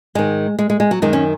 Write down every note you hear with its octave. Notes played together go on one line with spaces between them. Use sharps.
G#2 D#3 G#3
G#3
G#3
G#3
F#3
F#2 D#3 G#3
C#4